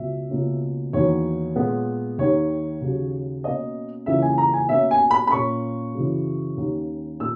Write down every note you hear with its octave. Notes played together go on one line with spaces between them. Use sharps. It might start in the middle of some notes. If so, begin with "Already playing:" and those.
Already playing: C#2 B2 F#3 E5
C#2 B2 A#3 C#4
E2 D#3 F#3 A#3 C#5
A#2 G#3 B3
D#2 D#3 A#3 C#5
D#2 C#3 F#3
B2 A#3 C#4 D#5
C#2 C#3 E3 A#3 C#4 E5
G#5
A#5
G#5
B2 A#3 C#4 E5
G#5
B5
B5
A#2 A#3 C#4 C#6
F#2 C#3 E3
D#2 D#3 A#3 C#4
A#2 A#3 E6